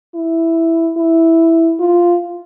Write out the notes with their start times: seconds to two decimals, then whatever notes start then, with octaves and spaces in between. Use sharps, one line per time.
0.15 E4
0.97 E4
1.80 F4